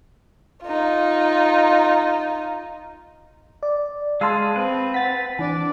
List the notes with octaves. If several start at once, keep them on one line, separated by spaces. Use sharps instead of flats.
D#4 F4
D5
G#3 G#4 F5 A5 C6 E6
C4 B4
F#5 A6 B6
E3 D4 D5 G#5